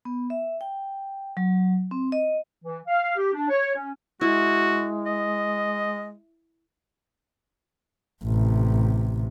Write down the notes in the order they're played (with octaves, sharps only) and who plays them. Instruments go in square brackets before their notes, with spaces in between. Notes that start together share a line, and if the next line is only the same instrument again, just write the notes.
[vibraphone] B3
E5
G5
F#3
C4
D#5
[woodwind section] E3
F5
G4
D4
C#5
C#4
[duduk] G#3 [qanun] E4 [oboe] F#4
[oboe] D#5
[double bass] A1 C3